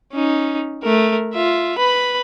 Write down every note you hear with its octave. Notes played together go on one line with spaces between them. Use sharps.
C#4 D#4
A3 A#4
F4 E5
B4 B5